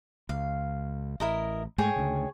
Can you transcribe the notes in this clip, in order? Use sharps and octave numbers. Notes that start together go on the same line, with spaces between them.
C#2 F5
A1 E4 A#4 D#5
G#2 G#3 A3 G#4 C#5 G5
D2 C#3